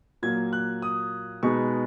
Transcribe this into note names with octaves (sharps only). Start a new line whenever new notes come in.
A#2 F#3 A#3 G#6
F#6
D#6
B2 G#3 B3 D#4 C#6